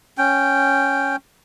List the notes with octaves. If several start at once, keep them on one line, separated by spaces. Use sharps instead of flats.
C#4 G5